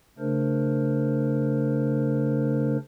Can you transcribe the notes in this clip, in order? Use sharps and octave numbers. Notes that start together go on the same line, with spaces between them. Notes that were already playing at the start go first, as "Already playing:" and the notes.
C#3 A3 D4 A#4 C5